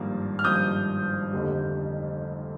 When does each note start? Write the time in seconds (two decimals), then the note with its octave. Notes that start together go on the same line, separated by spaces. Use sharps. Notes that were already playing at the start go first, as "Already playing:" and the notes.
Already playing: G#1 G2 F3 A#3
0.39 F6
0.44 G#1 G2 F3 A#3 D#6 G6
1.33 F1 F2 D3 G3 A#3